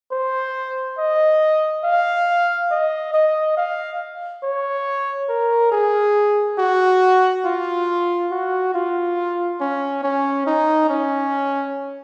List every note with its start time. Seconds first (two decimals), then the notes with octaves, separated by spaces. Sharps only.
0.11 C5
0.98 D#5
1.84 F5
2.71 D#5
3.14 D#5
3.57 F5
4.43 C#5
5.29 A#4
5.72 G#4
6.58 F#4
7.45 F4
8.31 F#4
8.74 F4
9.60 C#4
10.03 C#4
10.46 D#4
10.89 C#4